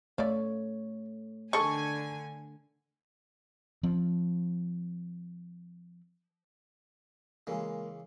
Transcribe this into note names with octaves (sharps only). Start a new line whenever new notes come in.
A3 C#5 D5 E5 F5
D3 D#3 A4 G#5 C#6
F3 C4
C#3 E3 G#3 A#3